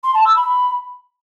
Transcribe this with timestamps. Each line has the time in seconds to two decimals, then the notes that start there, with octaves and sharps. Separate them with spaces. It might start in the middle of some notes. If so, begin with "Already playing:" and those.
0.03 C6
0.14 A5
0.25 E6
0.36 B5